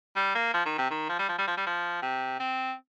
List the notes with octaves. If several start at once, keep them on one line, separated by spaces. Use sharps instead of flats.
G3
A#3
F3
D#3
C3
D#3
F3
G3
F3
G3
F3
G3
F3
C3
C4